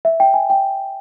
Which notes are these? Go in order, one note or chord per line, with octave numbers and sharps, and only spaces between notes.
E5
G5
G#5
G5